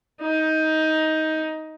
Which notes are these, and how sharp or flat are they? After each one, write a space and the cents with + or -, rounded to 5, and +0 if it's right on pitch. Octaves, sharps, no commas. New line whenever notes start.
D#4 +15